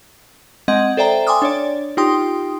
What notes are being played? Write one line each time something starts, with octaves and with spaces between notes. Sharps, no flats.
G#3 C4 D#5 F#5 G#6
A4 C5 D5 E5 G5 A#5
G5 G#5 C6 D6 D#6 F6
D4 C#5 D5
D#4 F4 G4 G5 C6 D#6